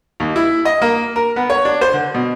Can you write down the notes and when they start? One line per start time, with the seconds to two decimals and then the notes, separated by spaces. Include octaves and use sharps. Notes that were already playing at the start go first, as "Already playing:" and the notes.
0.20 D#2
0.36 E4
0.65 D#5
0.82 A#3
1.16 A#4
1.36 B3
1.50 C#5
1.65 D4
1.81 C5
1.93 D3
2.14 B2